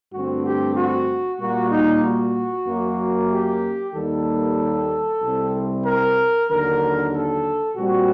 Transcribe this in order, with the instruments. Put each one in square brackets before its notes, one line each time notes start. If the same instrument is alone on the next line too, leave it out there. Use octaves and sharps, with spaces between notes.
[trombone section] G2 D3 A3 C4 F#4
G4
F#4
A#2 G3 A#3 F#4
D#4
F#4
F#2 F#3 A#3
G4
D#2 D#3 G3 A#3 A4
C2 C3 G3 C4
A#4
D#2 D3 F#3 A#4
A4
A#2 G3 C4 F#4